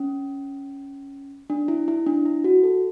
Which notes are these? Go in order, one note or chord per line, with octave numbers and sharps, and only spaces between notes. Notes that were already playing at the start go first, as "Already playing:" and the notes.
Already playing: C#4
D4
E4
E4
D4
E4
F#4
A4